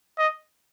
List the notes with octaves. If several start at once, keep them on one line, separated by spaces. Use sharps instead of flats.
D#5